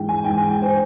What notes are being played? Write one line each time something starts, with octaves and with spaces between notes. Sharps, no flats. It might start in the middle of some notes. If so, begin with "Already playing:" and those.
Already playing: G#2 E3 G5
G#5
G#2 E3 G5
G#5
G5
C5